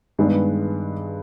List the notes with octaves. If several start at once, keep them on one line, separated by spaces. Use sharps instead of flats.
G2 D#3 G#3 B3 D4